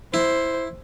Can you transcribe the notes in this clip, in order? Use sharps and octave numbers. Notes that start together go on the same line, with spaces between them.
E4 C5